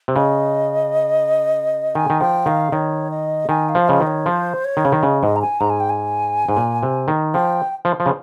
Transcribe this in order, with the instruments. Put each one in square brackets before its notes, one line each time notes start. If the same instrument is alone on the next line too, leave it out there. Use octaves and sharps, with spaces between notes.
[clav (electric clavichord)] C3
[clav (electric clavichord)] C#3 [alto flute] D#5
[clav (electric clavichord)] D#3 [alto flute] G#5
[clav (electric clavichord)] D#3
[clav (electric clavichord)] F3 [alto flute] G5
[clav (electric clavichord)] D#3 [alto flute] F5
[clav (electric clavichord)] D#3 [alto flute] C#5
[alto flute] D#5
[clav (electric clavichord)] D#3 [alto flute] G#5
[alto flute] F5
[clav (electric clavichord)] F3
[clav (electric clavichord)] C#3 [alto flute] D#5
[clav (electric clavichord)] D#3
[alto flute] C#5
[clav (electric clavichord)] F3 [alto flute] C5
[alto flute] C#5
[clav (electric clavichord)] D#3
C#3
D#3
[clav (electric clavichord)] C#3 [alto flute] D#5
[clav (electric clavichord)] G#2 [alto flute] D#5
[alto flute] A#5
G#5
[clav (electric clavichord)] G#2 [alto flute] A#5
[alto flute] G#5
G5
G#5
[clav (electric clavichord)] G#2
A#2
C3
D#3
[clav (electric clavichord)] F3 [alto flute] G5
[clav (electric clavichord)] F3
F3
C#3